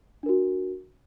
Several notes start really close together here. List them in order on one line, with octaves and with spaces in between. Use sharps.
D4 A#4 F#4